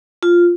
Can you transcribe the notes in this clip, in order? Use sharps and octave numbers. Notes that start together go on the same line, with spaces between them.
F4